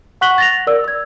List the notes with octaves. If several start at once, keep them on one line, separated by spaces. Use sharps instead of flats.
F#5 C#6 F#6 B6 F#7 G7
A6 A#6 F7
A#4 D5 E6
E6 G#6